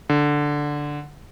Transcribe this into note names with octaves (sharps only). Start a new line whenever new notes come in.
D3